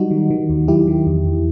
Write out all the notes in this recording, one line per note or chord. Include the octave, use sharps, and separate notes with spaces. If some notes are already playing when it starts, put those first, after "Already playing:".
Already playing: F#3 G3 D#4 F#4
D#3
D#3
D#2
F#3 E4 G4
D#3
E2
E2